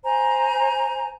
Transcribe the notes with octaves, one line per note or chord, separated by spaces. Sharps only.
C5 G#5 A#5